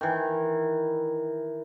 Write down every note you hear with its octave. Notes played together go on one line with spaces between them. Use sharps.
D#3 E3